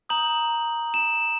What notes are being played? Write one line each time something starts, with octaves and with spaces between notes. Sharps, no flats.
A#5 D#6 G6 F#7
E7